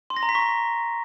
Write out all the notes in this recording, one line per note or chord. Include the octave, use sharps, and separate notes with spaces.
C6
A#6
A#5
B6
C#6